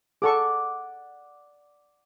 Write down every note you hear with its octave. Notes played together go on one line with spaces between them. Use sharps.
G#4 A4 D5 F#5 C#6 D6